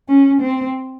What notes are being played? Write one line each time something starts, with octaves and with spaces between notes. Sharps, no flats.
C#4
C4